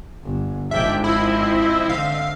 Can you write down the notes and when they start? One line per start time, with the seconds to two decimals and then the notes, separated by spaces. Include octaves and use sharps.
0.23 G1
0.71 G#1 F3 G#3 D4 E5 G5
1.04 C4 E4 D#5 E5
1.89 D3 F5